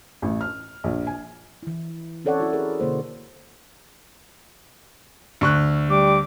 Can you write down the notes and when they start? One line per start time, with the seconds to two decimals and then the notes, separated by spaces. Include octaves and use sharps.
0.22 A1
0.41 F6
0.84 A#1
1.07 G#5
1.63 E3 E4
2.25 C4 C#4 A4 C#5 D5 F#5
2.40 E4 F#4
2.53 G#4 A#4
2.80 B2 D3 A#3 C5
5.41 D2 C#6 F#6
5.90 G3 D6